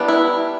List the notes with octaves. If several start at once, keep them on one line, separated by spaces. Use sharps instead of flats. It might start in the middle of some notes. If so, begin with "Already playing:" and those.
Already playing: E3 G3 B3 D4
E4